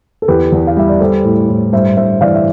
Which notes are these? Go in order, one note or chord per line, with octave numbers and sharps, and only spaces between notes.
A4
E2 G4 B4
E2
F5
G3 E5
D5
G3 A4 C5
A2
A2
G2 C5 E5
G2 C5 E5
E3 D5 F5
E5